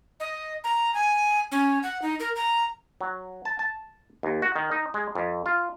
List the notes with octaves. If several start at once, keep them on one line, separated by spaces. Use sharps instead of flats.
D#5
A#5
G#5
C#4
F#5
D#4
A#4
A#5
F#3
A5
A5
D#2
F#4
D#3
D#4
G#3
F2
F4